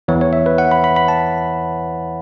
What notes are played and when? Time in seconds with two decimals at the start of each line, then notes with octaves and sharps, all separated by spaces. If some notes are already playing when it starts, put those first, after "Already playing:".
0.08 E2 E3 C#5
0.21 C#5
0.33 E5
0.46 B4
0.58 F#5
0.71 B5
0.84 B5
0.96 B5
1.08 A5